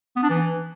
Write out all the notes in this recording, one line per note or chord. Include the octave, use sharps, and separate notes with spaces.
B3
D4
E3